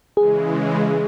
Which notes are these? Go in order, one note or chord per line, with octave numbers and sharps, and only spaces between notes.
C#3 E3 G#3 G#4